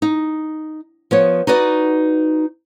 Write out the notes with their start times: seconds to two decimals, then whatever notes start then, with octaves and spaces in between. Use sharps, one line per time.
0.02 D#4
1.11 F3 B3 C#5
1.47 D#4 F#4 B4 D5